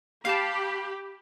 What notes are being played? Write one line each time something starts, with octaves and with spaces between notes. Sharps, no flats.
G4 F5 A5 B5